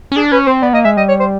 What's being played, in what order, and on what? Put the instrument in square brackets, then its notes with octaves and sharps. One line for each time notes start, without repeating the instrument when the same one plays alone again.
[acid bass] C#4
[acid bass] D4 [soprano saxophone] G#4
[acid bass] C#4 [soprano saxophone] B4
[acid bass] C4 [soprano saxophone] C5
[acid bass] B3 [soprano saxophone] D5
[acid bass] A#3 [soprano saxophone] D#5
[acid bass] G#3 [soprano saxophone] E5
[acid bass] G3 [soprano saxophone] D#5
[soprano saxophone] C#5
C5